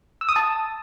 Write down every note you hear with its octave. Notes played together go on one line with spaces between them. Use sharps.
E6
D#6
A5